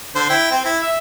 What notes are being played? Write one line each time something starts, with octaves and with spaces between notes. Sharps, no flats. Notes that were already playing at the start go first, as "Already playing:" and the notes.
D3 C5
E4 G5
C4
E4
E5